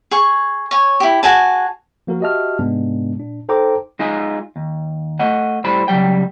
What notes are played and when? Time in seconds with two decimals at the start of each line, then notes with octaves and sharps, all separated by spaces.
0.11 G#4 C#6
0.71 C#5 G#5
1.00 E4 G4
1.23 F#4 G#4 G#5 A5
2.07 F3 A#3 F#4 A#4
2.20 F#4 G4 D#5 E5 A5 F6
2.59 G#2 C3 G#3 B3 D4
3.16 A#2 D4
3.49 D#4 A4 C5 G5 A#5 D6
3.99 G#3 D#4 F4 G#4
4.56 D#2
5.19 A3 D#5 F#5
5.64 A2 G3 C5 B5
5.88 C#2 G#2 F#3 G3 G5